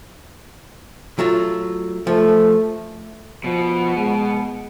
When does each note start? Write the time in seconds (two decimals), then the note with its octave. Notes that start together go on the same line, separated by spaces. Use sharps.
1.19 F#3 A3 F4
2.07 F3 A3
3.44 B2 F3
3.96 G#3